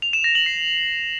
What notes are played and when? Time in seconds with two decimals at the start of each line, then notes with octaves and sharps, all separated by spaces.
0.02 F7
0.13 E7
0.24 A#6
0.35 F#7
0.46 C7